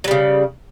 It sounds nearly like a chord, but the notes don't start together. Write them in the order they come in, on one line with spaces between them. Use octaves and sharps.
F#3 G3 C#3